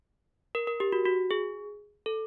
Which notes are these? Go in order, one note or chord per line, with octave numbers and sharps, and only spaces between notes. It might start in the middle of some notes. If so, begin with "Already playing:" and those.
A#4
A#4
G4
F#4
F#4
G#4
A4